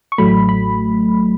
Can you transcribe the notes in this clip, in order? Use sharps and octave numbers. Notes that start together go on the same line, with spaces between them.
C#6
A1 A2 F#3 A3 B5
B5